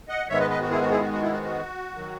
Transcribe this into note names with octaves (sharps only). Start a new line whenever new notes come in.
D#5 F#5
G#2 D#3 G#3 B3 C#5 E5
B4 D#5
B4 D#5
F#4
E4 G#4
F#4
E4 G#4
F#4
F#4
E4
F#4
F#4
D#3 F#3